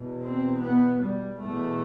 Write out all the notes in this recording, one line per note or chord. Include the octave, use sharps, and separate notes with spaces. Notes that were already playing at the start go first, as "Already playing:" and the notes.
Already playing: E2 B2
C4
B3
G3
E2 B2 A3